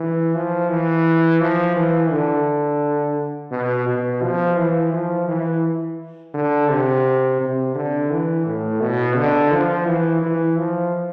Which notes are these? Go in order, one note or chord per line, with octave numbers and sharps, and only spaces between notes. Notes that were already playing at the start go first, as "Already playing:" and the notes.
Already playing: E3
F3
E3
F3
E3
D3
B2
B2
F3
E3
F3
E3
D3
C3
C3
D3
E3
A2
B2
D3
F3
E3
E3
F3